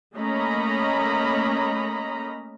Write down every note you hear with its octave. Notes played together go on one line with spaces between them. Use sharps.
A3 A#3 C#4 D#5 A#5 B5